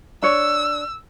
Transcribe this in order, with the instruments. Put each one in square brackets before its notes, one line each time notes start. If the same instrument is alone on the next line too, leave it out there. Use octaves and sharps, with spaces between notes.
[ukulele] D4 C#5 [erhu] E6